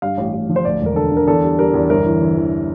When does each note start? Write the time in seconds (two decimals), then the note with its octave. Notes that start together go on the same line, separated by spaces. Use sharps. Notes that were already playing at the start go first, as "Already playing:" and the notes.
0.02 G2 F5
0.18 A1
0.34 A1
0.49 F3
0.56 C5
0.65 D2 D5
0.81 E1
0.86 A#4
0.96 D3 A4
1.12 D3
1.17 A#4
1.27 E2 A4
1.44 G3
1.59 G3 A#4
1.74 E2
1.90 G1 A#4
2.06 E3
2.21 E3
2.37 E3